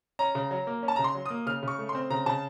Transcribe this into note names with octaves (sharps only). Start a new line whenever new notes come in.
C#4 A#5
C#3
F#3
A#3
C#4
A5
C#3 A#5
C6
F#3
A#3 D#6
C#3 F6
C#3 C#6
A3
C6
C4
C#3 A#5
C#3 A5